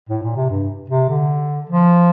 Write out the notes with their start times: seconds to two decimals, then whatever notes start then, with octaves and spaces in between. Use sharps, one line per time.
0.09 A2
0.23 A#2
0.36 C3
0.50 G2
0.89 C3
1.09 D3
1.69 F3